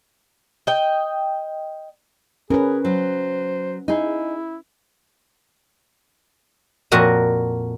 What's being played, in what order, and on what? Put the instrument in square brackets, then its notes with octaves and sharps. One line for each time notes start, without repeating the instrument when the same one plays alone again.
[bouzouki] D#5 G5
[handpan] C#4 B4 [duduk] G#4 [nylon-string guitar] A#4
[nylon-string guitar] F#3 [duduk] C5
[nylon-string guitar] D#4 G#4 [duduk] E4
[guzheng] F2 A#2 F#4 A#4 D#5